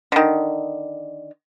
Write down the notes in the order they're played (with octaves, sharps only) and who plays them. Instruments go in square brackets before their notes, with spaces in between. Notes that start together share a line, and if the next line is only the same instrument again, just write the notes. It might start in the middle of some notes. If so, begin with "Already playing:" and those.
[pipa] D3 D#3